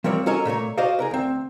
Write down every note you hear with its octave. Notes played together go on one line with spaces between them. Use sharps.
F3 G3 C4 A#4 C#5 D5
C#4 F#4 A4 A#4 C#5 D#5
A#2 A3 A#3 C#5
F#4 C5 D5 D#5 F5
G#4 A#4 B4
D2 C4